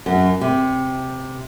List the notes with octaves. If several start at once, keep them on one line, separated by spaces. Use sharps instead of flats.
F#2
C3